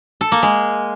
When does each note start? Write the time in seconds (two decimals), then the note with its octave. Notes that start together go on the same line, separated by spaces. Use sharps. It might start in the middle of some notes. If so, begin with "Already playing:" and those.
0.21 A4
0.32 A#3
0.43 G#3